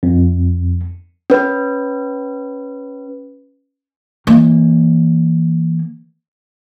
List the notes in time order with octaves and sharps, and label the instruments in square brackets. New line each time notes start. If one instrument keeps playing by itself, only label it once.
[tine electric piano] F2
[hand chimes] C#4 B4
[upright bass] E3 A#3